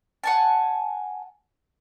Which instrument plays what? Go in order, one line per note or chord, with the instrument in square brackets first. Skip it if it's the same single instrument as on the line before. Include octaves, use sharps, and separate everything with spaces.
[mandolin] F#5 G#5 A5